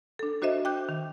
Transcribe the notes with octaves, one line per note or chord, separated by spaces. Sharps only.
D4 A4
D4 F#4 C5 D#5 E5
G5 D6 F#6 G6
D#3